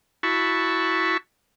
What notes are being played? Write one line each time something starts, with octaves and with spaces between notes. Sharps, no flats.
E4 F#4 A5 B5 C#6